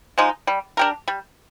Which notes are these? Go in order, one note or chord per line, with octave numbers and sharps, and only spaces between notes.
F3 G#3 D#4
G3
D4 G4 A#4
G3